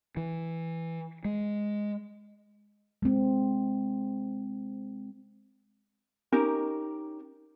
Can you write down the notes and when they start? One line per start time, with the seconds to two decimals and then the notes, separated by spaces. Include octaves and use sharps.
0.17 E3
1.25 G#3
3.02 G#3 C4
6.32 C#4 D#4 G4 A#4